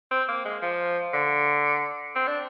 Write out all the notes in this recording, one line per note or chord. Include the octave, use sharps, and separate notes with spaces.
C4
A#3
G#3
F3
D3
C4
D4